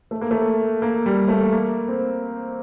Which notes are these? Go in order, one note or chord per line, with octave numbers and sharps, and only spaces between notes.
A3
A#3
A3
A#3
G3
A3
A#3
C4